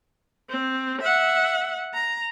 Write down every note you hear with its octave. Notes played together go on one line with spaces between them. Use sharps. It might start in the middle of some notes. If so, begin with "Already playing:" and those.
C4
E5 F#5
A#5